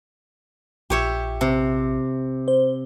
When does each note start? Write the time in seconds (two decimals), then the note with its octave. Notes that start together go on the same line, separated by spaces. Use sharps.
0.90 A#1 G4 C#5 E5
1.41 C3
2.48 C5